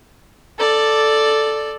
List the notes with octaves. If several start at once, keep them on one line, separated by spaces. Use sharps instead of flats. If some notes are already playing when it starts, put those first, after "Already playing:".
A4 D5